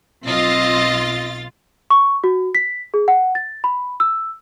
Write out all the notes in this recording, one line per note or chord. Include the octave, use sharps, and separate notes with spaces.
B1 C4 F4 D#5 A6
C#6
F#4
B6
G#4
F#5
A6
B5
E6